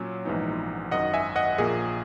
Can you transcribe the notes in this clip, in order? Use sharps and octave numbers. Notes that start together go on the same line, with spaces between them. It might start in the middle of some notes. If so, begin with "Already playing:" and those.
Already playing: A#2 F#3 C#4
A#1 G#2 E3 B3 D#4
G#1 F#2 D#3 D#5 F#5
E5 G#5
D#5 F#5
A#1 A#2 A#3 G#4